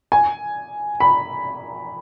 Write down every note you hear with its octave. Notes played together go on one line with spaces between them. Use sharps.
G#5
B5